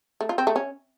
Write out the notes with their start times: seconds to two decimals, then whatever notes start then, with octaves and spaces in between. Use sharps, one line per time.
0.21 A3
0.29 F4
0.38 C4
0.47 A3
0.56 C#4